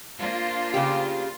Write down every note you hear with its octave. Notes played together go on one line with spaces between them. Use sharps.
A#3 D4 F4 C5
C#3 G4